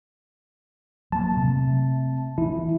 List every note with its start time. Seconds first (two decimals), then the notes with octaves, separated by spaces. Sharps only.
1.12 F#3 A#3 A5
1.37 C3 A3
2.38 E3 E4